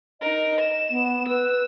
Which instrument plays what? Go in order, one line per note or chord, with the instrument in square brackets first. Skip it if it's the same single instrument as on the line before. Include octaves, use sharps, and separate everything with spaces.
[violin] D#4 A#4 [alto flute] D#5
[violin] E7
[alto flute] B3
[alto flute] B4 [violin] E6